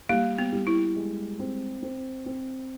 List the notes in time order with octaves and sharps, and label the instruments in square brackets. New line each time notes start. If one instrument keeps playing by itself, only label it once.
[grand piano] G3 [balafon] A#3
[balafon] B3
[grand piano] G3
[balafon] E4
[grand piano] G#3
C4
C4
C4